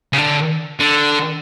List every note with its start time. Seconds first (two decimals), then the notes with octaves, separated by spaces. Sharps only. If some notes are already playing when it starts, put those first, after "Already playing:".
0.13 C#3
0.18 D3
0.80 D3